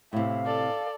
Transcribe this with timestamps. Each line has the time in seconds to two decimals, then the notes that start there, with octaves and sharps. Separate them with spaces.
0.13 A2 C3 E4 F5
0.46 A4 D5